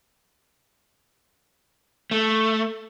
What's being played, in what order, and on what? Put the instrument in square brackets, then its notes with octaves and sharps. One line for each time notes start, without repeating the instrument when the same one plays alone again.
[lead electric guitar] A3